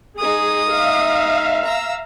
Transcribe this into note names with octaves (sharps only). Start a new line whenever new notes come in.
G#3 D#4 G#4 D#6
E5 F5
A#5 E6